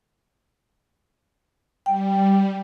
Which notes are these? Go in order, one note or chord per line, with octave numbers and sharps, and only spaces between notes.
G3 G5